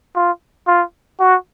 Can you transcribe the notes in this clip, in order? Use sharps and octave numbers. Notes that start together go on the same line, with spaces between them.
F4
F4
F#4